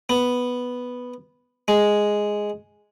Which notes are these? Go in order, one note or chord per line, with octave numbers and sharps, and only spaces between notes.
B3
G#3